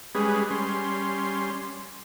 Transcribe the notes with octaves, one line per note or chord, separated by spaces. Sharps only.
G3 G#3 C#4 G#4 B4
G3 C#4 C6